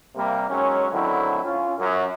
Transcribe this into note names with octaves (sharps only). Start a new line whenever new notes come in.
C3 G3 A#3
D#3 F#3 G#3 C#4
D3 D#3 F#3 A3 C4 E4
C#4 F4
F#2